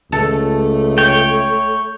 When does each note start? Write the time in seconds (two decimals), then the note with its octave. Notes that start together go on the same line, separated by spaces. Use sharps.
0.12 C#2 A3 A4
0.98 C#5 G5